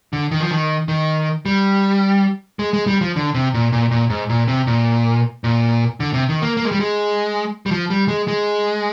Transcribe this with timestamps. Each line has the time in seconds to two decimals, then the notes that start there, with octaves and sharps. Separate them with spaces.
0.13 D3
0.31 D#3
0.41 F3
0.51 D#3
0.88 D#3
1.46 G3
2.59 G#3
2.73 G#3
2.87 G3
3.01 F3
3.16 D3
3.35 C3
3.54 A#2
3.73 A#2
3.91 A#2
4.10 G#2
4.30 A#2
4.48 C3
4.67 A#2
5.44 A#2
6.00 D3
6.14 C3
6.29 D#3
6.42 A#3
6.57 A#3
6.65 G#3
6.72 G3
6.80 G#3
7.66 G3
7.71 F3
7.90 G3
8.08 G#3
8.28 G#3